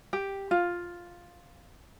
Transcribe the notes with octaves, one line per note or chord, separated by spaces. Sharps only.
G4
F4